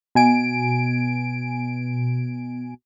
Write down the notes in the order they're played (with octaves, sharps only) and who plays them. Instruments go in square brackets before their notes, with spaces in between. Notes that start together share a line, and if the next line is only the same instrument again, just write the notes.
[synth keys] B2 G#5 D7